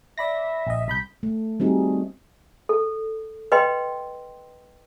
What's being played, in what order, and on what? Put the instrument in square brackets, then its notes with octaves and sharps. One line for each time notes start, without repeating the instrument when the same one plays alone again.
[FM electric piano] D5 B5 A#6 [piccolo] E5
[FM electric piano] A#1 D#5
[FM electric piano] C2 B5 G6 [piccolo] B6
[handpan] A3
G3 C4 D#4 F#4 G#4
[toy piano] A4
B4 D#5 G5 C6